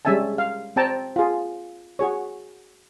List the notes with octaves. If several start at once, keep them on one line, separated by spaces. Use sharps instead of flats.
G3 G#3 C#4 E5 G#5 A5
F5
C4 G5 A5 A#5
F4 G#4
F#4 G#4 C#5